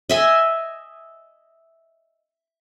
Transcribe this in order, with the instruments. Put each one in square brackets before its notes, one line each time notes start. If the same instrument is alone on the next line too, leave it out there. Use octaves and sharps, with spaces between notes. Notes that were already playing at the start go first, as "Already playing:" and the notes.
[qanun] D#5 E5 G#5